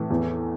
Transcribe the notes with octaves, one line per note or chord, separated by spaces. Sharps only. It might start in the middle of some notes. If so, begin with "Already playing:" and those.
Already playing: A2 E3
E2